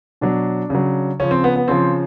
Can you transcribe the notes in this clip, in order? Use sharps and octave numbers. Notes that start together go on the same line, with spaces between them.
B2 F#3 D4
C#3 F#3
C#3 F3 C#4
C4
B3
B3
C#3 F3 C4